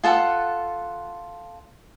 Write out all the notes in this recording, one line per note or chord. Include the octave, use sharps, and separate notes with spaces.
F4 A4 F#5